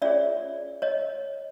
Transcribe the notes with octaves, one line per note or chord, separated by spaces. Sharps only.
C#4 F4 G#4 C#5 D5 E5
C#5 D#5